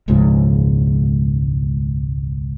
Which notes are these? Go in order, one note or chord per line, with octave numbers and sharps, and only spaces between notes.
E1 C#2 G#2 F3